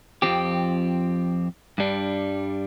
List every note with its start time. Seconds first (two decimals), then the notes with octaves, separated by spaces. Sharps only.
0.22 F2 F3 C4 G4
1.78 G2 G3 D4